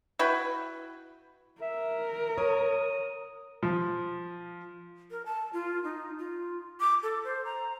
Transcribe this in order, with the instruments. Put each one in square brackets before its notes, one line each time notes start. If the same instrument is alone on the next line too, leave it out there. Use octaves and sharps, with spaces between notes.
[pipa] E4 F#4 B4 G5
[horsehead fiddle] A#4 [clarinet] E5
[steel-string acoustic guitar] C#5 [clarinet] D#6
[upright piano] F3
[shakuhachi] A#4
A5
F4
D#4
F4
D6
A4
C5
A#5